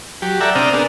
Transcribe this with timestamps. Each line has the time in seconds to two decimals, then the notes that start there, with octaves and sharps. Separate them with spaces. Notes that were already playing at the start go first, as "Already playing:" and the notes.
0.22 F#3 G4
0.41 A4 D5 E5 F#5 G5 A#5
0.55 C3 C4 D4 A#5 D#6 F6
0.73 B3 D4 G#4 A#4